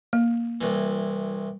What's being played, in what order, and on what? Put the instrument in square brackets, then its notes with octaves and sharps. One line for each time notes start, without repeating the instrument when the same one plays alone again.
[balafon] A#3
[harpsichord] C2 E3